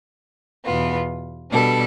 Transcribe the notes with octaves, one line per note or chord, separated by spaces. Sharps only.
E2 B2 B3 F4
B2 G3 D4 A4